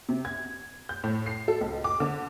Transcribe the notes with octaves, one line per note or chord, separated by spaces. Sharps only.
C3
G#6
G6
A2
C7
A4
C#2
D6
D3